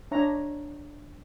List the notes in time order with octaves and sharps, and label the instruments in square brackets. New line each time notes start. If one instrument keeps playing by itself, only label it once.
[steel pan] D4 C#5 E5 A#5